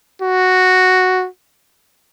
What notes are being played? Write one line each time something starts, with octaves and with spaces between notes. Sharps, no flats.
F#4